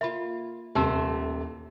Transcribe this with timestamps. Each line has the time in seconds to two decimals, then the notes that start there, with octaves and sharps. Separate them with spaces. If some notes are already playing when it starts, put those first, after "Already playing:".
0.01 A#3 F4 E5 B5
0.75 D#1 C3 E3 A3 G4 A5 E6